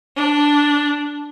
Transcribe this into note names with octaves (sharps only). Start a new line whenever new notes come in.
D4